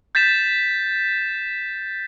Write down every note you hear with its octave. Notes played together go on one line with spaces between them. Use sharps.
G6 A6 B6 E7